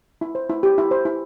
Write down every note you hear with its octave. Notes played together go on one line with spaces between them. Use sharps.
E4
C5
E4
G4
E4
C5
E4